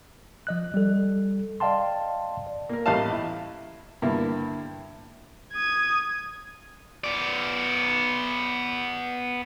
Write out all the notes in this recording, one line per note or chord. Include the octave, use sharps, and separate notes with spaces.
F3 D#5 F#6
G3 A4
D5 D#5 F5 G5 A5 C6
D5
A#3 A#4
A1 G3 D#5 F5 A5
E4
G2 D3 A#3 E4
D#6 G#6
B3 D5